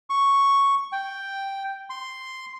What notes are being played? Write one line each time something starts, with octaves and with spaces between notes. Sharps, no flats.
C#6
G5
C6